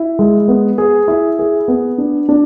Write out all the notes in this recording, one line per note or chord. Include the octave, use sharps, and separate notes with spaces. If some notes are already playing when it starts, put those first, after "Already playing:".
Already playing: E4
G#3
B3
G#4
E4
G#4
B3
D4
D4